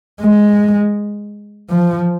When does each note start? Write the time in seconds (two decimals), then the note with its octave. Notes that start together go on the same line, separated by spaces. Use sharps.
0.21 G#3
1.70 F3